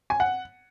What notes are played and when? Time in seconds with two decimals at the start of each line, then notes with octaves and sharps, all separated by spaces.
0.10 G#5
0.20 F#5